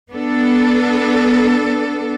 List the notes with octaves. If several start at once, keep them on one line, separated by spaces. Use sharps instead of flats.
B3 D4 A4